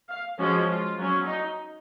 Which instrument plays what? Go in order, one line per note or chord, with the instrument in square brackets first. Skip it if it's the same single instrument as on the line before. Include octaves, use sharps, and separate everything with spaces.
[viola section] F5
F3 G#3 C#4 F#4
F4
F#3 C#4
D#4